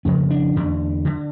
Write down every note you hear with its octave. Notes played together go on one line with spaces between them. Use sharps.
F2 C#3 C#4
D4
E2 D3
D3